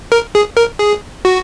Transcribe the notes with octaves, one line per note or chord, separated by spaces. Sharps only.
A#4
G#4
A#4
G#4
F#4